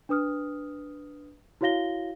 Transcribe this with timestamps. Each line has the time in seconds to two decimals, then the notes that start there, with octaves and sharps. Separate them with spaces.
0.09 D4 B4 D#6 F6
1.61 E4 F#4 C#5 F5 A#6 G7